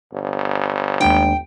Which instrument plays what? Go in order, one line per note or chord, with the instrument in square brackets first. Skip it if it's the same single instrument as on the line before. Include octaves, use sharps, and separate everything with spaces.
[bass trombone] G1
[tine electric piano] D#2 G#3 D4 [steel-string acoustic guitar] G5